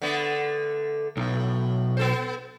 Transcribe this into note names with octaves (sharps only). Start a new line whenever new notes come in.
D3 A3 B3
B1 A2
B3 A4 C5